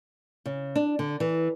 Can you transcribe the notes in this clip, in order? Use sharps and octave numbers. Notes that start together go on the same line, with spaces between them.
C#3
D4
D3
E3